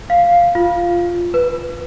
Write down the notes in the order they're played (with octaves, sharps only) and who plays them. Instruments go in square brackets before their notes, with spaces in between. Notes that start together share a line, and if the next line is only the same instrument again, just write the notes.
[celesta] F5
F4
B4